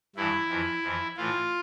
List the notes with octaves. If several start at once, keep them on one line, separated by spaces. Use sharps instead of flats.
G2 E3 E4
F2 E3
F2 E3
A2 E3 F4